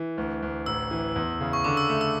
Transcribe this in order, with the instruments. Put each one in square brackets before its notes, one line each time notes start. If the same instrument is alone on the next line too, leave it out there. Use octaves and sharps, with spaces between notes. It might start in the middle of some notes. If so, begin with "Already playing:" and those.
Already playing: [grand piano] E3
D2
D2
[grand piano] A1 [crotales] E6
[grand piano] E3
E2
C#3
[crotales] C#6
[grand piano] D3 [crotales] D6
[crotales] E6
[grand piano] A3
[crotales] E6